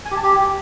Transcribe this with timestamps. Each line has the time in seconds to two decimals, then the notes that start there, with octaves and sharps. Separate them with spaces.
0.05 G#5
0.11 G4
0.17 A5
0.23 G4